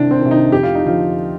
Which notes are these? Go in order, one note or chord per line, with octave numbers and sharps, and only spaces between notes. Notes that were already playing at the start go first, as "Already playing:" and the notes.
Already playing: C2 C3 D#3 D4
C4
C3 D#3
D#4
F2 G4
F4
D#4
D3 F3 F4